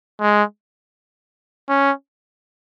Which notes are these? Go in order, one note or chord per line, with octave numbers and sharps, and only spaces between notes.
G#3
C#4